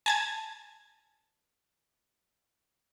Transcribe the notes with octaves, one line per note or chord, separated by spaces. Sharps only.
G#5 A5 G#6